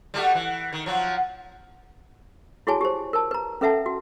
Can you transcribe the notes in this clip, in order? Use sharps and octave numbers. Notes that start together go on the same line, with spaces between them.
G3 A3 F#4
E3
D#3
F3 F#3
E4 F#4 G#4 C#5 G#5 A5
G4 C5
A#4 A5
B4 A#5
C#4 A4 B4 E5 F#5 A5
F#4